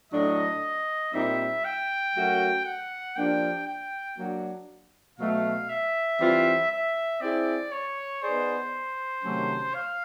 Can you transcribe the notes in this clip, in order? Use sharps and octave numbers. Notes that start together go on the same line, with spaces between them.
A2 F#3 A3 D4 D#5
A#2 G3 C4 D#4 E5
G5
F#3 A3 C#4 F#4 A#4
F#5
F3 A#3 D4 G4 G5
G5
F#3 A#3 D4 F#4
B2 F#3 A3 F5
E5
E3 G3 C4 F4
E5
C4 E4 G#4 D5
C#5
B3 D#4 G#4 B4 C5 D5
C3 D#3 F#3 A3 C#4
F5